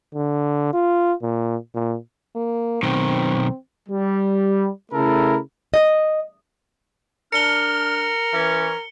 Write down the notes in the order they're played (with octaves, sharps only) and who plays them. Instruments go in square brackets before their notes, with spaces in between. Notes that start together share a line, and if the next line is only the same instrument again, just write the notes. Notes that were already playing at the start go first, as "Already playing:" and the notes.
[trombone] D3
F4
A#2
A#2
[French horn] A#3
[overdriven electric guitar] B1 D#3 [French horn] C4
[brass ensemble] G3
C#3 A3 E4 A4 A#4
[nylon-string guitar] D#5
[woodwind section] D4 F6 [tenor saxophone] A#4 [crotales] C#7 G7
[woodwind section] E3 C#4